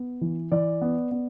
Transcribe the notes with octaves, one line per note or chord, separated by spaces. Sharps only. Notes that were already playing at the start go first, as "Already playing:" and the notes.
Already playing: B3
E3
E3 D5
B3
B3